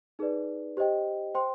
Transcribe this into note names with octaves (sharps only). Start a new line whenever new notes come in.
D#4 G#4 B4 D5
G4 C5 D#5 G5
C5 G5 C6